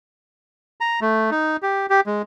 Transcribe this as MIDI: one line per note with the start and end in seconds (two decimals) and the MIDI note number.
0.81 1.00 82
1.01 1.30 57
1.31 1.57 63
1.63 1.86 67
1.90 2.01 67
2.06 2.22 56